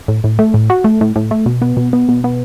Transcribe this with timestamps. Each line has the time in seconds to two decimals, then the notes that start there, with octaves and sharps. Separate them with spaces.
0.08 A2
0.24 A2
0.39 A3
0.54 A2
0.70 F#4
0.84 A3
1.01 A2
1.16 A2
1.31 A3
1.46 B2
1.62 B3
1.77 B2
1.93 B3
2.09 B2
2.24 B3